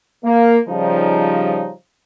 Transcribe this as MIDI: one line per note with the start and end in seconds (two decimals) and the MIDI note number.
0.25 0.58 58
0.69 1.70 49
0.69 1.70 53
0.69 1.70 55
0.69 1.70 63